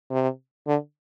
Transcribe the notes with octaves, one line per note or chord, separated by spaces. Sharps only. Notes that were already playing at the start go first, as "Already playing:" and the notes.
C3
D3